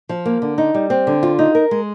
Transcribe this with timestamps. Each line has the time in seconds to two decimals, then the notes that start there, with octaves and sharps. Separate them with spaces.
0.09 F3
0.25 A#3
0.42 D3
0.58 D#4
0.74 G3
0.90 C4
1.07 D3
1.23 F4
1.39 D#4
1.55 A#4
1.71 G#3